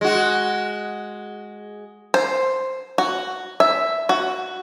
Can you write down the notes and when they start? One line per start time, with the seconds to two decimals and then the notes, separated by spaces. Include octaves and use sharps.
0.01 G#3 F#4
2.14 C5
2.98 F#4
3.60 E5
4.09 F#4